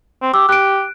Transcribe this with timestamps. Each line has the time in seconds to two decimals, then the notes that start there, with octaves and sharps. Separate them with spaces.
0.22 C4
0.34 G4 D6 E6
0.49 G4 F#6 D7